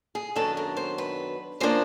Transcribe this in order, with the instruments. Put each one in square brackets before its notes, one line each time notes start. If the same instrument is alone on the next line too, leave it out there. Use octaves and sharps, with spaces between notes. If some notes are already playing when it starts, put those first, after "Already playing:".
[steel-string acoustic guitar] G#4
F#2 D#3 F#3 B3 D4 A4
A#4
C5
B4
C#3 F3 A#3 D4 C5